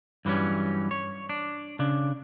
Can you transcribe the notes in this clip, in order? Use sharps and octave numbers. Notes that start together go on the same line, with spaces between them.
G2 E3 F#3 G3 C#4
C#5
D4
C#3 D4